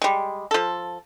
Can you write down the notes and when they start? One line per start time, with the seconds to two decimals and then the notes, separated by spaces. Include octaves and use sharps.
0.02 G3 G#3
0.51 F3 A4